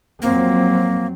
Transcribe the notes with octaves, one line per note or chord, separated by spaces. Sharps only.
F2 F#3 A#3 C4